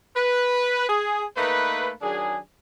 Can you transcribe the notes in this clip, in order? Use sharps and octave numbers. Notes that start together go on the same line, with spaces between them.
B4
G#4
A3 A#3 D#4 B4
D#3 F#3 D4 G#4